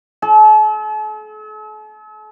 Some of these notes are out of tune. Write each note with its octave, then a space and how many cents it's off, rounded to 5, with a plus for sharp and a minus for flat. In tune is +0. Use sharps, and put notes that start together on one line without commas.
A4 -45